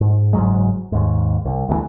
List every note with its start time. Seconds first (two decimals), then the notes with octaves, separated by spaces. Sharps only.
0.01 G#2
0.33 F#1 G#2 F#3 G#3
0.92 D#2 G#2
1.45 C2
1.69 D2 B2 E3